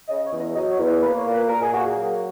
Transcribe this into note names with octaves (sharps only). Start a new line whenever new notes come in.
C#3 D#5
C#5
E2
D#5
F#3 D#5
C#5
E2
B4
A#3 B4
C#5
A#2
B4
A#2 A#4
G#4
A#3 F#4
G#4
F#3